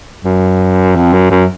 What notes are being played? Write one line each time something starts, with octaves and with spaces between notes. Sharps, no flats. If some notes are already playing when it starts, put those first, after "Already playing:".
F#2
F2
F#2
F#2